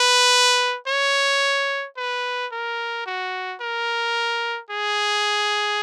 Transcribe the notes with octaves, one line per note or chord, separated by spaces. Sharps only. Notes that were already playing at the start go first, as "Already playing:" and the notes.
Already playing: B4
C#5
B4
A#4
F#4
A#4
G#4